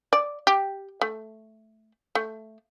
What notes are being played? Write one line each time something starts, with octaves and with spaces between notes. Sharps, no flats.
D5
G4
A3
A3